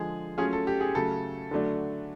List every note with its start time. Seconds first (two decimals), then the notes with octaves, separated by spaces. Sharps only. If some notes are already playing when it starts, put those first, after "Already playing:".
Already playing: D3 F3 G#3 G#4
0.38 F#3 A3 C#4 F4 G#4
0.53 A4
0.67 G4
0.81 G#4
0.95 C#3 F#3 A3 A4
1.51 D3 F#3 A3 D4